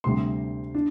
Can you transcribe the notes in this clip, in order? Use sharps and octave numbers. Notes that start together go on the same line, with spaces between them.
D2 C3 G3 C6
D4